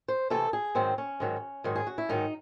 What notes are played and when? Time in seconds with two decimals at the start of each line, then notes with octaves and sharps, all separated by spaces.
0.08 C5
0.30 C3 E3 A3 A4
0.53 G#4
0.75 G#2 D#3 F#3 C4
0.98 C#4
1.20 G#2 D#3 F#3
1.64 G#2 D#3 F#3
1.76 G#4
1.87 F#4
1.98 E4
2.09 G#2 D#3 F#3 D#4